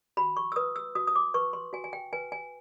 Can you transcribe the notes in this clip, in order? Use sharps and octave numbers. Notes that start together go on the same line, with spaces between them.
F#4 B5
C#6
E6
B4 D#6
E6
F#4 D#6
D#6
D6
B4 C#6
C6
F#4 G#5
G#5
G5
B4 G#5
G#5